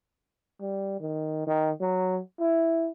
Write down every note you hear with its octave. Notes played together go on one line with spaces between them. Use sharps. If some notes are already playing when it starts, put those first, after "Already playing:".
G3
D#3
D#3
F#3
E4